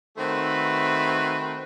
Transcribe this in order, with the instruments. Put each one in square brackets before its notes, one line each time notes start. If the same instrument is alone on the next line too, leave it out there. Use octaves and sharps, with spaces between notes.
[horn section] D#3 A3 C4 F#4 B4